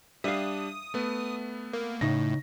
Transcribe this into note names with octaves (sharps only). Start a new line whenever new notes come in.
G3 D4 E5 F5 D#6
A3 B3
A#3
A2 C#3 D#4 A#6